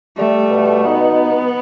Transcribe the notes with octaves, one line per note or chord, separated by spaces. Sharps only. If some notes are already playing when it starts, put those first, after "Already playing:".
G3 A3
B2
B3 D#4